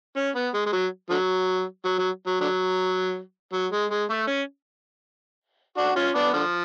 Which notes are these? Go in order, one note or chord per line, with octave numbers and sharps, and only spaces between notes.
C#4
B3
G#3
G#3
F#3
D3 F#3
F#3
F#3
F#3
D3 F#3
F#3
G#3
G#3
A3
C#4
D4 F#4
C#4 F4
B3 D4
D3 F3